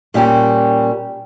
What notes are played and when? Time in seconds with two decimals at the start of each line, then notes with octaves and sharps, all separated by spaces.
0.14 A#2 G3 C#4 G4